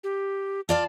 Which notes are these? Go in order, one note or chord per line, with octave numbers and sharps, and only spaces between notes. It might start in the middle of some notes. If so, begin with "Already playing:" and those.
G4
F4 D5 F5 A5